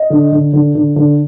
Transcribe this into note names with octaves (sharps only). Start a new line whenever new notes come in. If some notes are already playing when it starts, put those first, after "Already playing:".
Already playing: D#5
D3
D3
D3
D3
D3